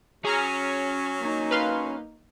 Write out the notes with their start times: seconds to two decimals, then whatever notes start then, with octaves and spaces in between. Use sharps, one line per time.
0.25 F#3 C#4 G#4 A#5 F6
1.20 A#3 D#4
1.51 B4 F5 C6